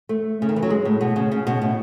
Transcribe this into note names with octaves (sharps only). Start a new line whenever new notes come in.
A3
C#3
D#3
E3
F#3
G#3
A2
B2
C#3
C#3
B2
A2